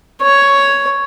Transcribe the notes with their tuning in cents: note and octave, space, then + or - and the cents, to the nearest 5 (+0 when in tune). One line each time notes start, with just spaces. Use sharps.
C#5 +5